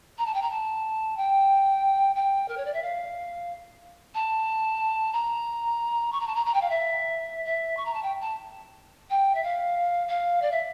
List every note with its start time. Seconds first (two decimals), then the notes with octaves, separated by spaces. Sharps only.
0.18 A#5
0.26 A5
0.34 G5
0.42 A#5
0.50 A5
1.17 G5
2.15 G5
2.48 A#4
2.57 C#5
2.65 D5
2.73 E5
2.82 F5
4.14 A5
5.13 A#5
6.12 C#6
6.20 A#5
6.27 A5
6.35 A#5
6.45 A#5
6.54 G5
6.61 F5
6.69 E5
7.45 E5
7.77 C#6
7.85 A#5
7.93 A5
8.02 G5
8.21 A5
9.10 G5
9.34 E5
9.43 F5
10.08 F5
10.42 D5
10.51 E5